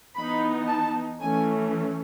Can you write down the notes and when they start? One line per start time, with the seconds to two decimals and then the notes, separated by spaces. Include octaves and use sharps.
0.15 E3 B3 D#4 B5
0.68 A5
1.21 E3 A3 C#4 G#5